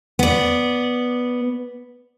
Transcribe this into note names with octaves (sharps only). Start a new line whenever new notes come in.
B3 D5